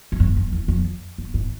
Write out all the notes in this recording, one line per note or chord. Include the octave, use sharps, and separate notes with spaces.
G2
F#2
F2
E2
F2
F#2
G#2